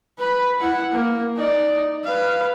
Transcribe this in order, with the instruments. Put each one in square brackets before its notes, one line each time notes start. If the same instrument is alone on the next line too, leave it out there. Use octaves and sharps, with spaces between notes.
[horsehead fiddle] B4 B5
E4 F#5
A#3
D#4 D5
B4 F5